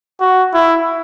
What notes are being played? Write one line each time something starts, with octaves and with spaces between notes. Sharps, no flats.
F#4
E4